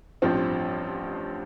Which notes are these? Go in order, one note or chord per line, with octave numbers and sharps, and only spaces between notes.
A1 G2 F3 C4